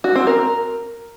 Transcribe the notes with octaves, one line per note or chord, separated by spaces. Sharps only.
F#4
C4
A#4